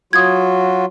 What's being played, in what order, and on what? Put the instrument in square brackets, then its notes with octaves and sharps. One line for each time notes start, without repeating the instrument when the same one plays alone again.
[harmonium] F#3 F4 F#4 [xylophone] D#6 G#6